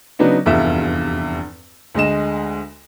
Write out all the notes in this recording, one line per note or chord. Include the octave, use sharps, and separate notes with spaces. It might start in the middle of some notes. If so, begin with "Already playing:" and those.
C#3 F#3 B3 D4 D#4
F1 E2 G2 F4 E5
D2 G#3 D#5 E7